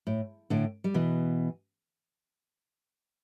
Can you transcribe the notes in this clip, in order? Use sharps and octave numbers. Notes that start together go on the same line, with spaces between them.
A2
A2 D3
G3
B2 E3